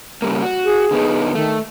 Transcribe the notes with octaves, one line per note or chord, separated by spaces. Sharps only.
C#3 G3 A#3
F#4
G#4
D3 B3 D#4
D#3 A3